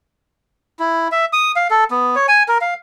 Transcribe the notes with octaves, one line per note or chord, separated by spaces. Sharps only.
E4
E5
D#6
F5
A4
B3
C#5
G#5
A#4
F5